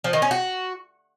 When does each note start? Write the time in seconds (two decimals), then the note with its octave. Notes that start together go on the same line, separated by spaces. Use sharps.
0.04 F3
0.13 D#3
0.22 C#4
0.31 F#4